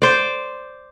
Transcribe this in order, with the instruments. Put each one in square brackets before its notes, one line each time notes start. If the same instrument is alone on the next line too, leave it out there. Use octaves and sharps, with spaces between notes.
[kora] C5 D5